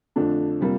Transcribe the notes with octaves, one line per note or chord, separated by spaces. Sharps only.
F2 D3 F3 A3 D4
C3 G3 A#3 F4